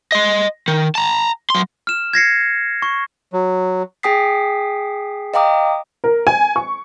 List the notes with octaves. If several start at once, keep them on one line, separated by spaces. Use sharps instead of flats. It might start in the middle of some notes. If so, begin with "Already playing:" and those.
D#5 C6
D#3
A5 A#5
F#3 C6
F6 E7
G#6 A#6 C7 C#7
C#6
F#3
G#4 G5 G#5 D#6 B6 C7
D#5 F5 G5 A#5 D6 D#6
A#4
G#5
C#6